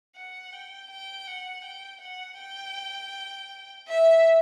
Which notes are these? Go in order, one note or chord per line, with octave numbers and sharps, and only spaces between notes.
F#5
G5
G5
F#5
G5
F#5
G5
E5